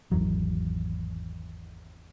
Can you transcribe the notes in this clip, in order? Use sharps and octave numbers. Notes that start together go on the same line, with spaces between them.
G#1 E2 F#3